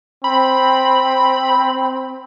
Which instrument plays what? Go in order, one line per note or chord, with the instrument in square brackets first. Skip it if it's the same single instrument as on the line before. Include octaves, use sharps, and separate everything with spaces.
[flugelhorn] C4 [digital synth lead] B5